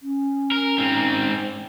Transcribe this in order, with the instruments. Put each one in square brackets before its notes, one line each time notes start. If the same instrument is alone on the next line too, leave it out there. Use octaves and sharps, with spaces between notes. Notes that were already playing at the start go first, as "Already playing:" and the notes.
[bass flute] C#4
[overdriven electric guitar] A#4
G#2 C4